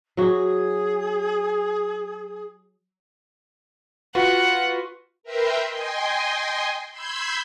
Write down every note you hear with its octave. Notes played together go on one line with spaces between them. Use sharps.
F#3 F#4 G#4
F4 F#4 B4 F#5
A#4 B4 E5 G5 A#5 C6
D#5 G5 G#5 C6
B5 C6 E6 G6 G#6 B6